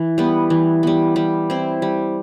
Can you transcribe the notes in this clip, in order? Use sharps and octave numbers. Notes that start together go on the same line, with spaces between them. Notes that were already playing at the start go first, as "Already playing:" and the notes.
Already playing: E3
G3 B3
E3
G3 B3
G3
C4 E4
G3